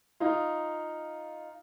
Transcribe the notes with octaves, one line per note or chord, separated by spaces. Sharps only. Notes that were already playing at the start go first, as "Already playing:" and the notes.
D#4 F4